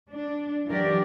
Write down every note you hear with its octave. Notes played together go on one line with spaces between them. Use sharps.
D4
E3 F#3 D4 G4 A#4 D5